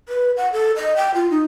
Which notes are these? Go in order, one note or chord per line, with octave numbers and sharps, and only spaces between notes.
B4
F#5
A4
D#5
G5
F4
D#4